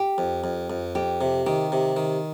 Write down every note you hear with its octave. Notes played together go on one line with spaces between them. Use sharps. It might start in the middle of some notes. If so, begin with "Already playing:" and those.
Already playing: G4
F2
F2
F2
F2 G4
C3
D#3 G4
C3
D#3